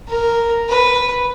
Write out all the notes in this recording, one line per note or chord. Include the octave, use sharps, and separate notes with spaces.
A#4
B4